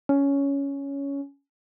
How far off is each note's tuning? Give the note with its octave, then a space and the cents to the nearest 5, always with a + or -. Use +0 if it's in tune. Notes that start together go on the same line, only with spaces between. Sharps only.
C#4 +10